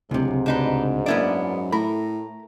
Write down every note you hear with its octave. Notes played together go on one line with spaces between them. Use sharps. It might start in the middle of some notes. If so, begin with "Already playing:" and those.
D1 C#2 G#2 C3
D2 D4 D#4 B4
F#2 A#3 B3 D4 E4 D5
A2 A3 A#4 B5